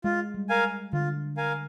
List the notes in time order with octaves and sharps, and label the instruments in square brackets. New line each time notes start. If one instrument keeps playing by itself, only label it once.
[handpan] G#3 [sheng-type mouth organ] F4
[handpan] G3
[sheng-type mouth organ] A#4 F5 G#5
[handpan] D3 [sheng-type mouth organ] F4
[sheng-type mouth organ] A#4 F5 G#5